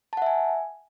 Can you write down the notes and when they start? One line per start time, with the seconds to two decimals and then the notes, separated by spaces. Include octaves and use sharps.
0.13 A5
0.17 F#5
0.22 E5
0.26 G#5